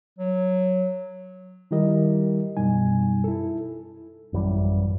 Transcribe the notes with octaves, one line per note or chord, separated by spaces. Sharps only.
F#3
D#3 G3 E4 G4 A#4 D#5
F#2 B2 G3 D#4 G#5
E4 A4
A1 F#2 E3 G3